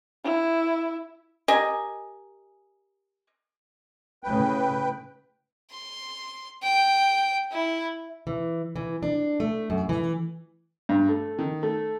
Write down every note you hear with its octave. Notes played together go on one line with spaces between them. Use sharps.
E4
G4 A#4 D#5 G#5
A2 C#3 B4 G5
C6
G5
E4
E3
E3
D4
A3
F#2
E3
G2
A3
D#3
A3